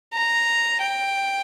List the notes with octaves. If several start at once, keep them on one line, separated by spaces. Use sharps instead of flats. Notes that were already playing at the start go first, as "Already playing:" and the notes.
A#5
G5